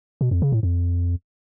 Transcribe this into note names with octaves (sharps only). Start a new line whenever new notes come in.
B2
F2
C#3
A2
F2